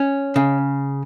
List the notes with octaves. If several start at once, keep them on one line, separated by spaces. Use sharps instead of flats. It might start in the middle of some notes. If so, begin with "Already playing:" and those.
Already playing: C#4
C#3